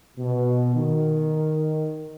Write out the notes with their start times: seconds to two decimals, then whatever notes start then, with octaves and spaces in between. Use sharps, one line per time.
0.17 B2
0.75 D#3